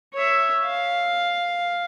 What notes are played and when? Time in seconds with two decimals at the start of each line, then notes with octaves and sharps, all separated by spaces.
0.14 C#5 E5
0.65 F5